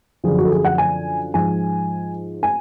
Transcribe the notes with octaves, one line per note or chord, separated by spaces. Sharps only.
F#2 D3 F3 G#4
F#4
A4
G#4
F#5
G#5
G#2 F3 G#5
G#5